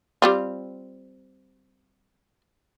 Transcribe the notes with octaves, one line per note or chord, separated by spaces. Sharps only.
G3 C4 F4